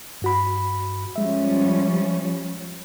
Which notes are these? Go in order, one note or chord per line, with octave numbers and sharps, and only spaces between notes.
G2 F#4 B5
F3 G3 G#3 C#4 E5